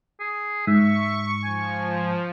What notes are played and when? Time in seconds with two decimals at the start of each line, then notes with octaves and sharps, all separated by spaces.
0.20 G#4
0.67 G#2 E5 C#6
1.44 F3 G#5